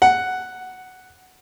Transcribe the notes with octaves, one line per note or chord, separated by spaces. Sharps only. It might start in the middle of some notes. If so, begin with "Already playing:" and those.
F#5